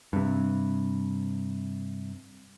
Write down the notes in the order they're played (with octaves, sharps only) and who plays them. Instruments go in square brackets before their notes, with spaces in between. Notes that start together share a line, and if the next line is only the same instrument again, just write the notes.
[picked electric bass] G2 C3